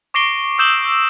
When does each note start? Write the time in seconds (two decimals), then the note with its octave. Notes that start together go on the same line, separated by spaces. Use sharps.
0.14 C#6 D6 A#6 C7 D7 G7
0.58 D#6 E6 G6 E7 F#7 G7